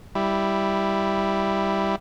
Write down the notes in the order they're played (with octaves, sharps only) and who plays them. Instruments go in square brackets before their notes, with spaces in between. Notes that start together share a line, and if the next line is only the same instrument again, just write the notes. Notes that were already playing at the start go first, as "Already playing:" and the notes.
[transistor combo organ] G3 E4